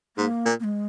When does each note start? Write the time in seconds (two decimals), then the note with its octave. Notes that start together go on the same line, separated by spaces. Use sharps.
0.17 G#2 A#3
0.46 A#2
0.60 A#3
0.64 G#3